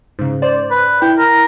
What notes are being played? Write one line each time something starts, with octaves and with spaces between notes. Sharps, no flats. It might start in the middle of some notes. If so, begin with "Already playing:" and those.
G#2 C#3
C5 D5
B4
E4 G5
A#4